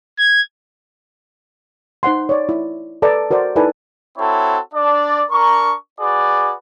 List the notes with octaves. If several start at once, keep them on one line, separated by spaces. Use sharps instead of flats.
G#6
D#4 C5 F#5 C6
C#5 D5
E4
A4 B4 D5 D#5 A5 A#5
F#4 A#4 C5 D5
D#4 E4 A4 B4 D5 G#5
C4 E4 F#4 A4 C#5
D4 D5
D4 A#4 A#5 C#6
F#4 G#4 B4 D5